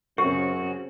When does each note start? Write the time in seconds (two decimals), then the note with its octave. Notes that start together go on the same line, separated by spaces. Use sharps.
0.18 F#2 C#3 C4 C#4 F#4 G4